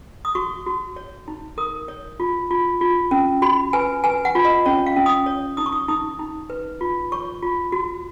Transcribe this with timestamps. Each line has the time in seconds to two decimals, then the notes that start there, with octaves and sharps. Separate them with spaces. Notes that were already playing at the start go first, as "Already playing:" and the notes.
0.25 D#6
0.35 F#4 C#6
0.66 F#4
0.96 C#5
1.28 D#4
1.58 A#4 D#6
1.88 C#5
2.20 F4
2.51 F4
2.81 F4
3.11 C#4
3.42 F#4 B5
3.73 B4 G#5
4.04 B4 G#5
4.25 F#5
4.35 F4
4.45 D#5
4.66 C#4 C#5
4.86 F5
4.96 C#4
5.06 D#6
5.26 C#5
5.57 D#4 D#6
5.66 C#6
5.72 D#6
5.88 D#4 D#6
6.19 D#4
6.50 B4
6.81 F4
7.12 C#5 C#6
7.42 F4
7.72 F#4